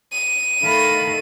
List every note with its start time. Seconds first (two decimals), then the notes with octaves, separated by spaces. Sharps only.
0.12 D#7
0.63 D#3 A3 A4 F5 B5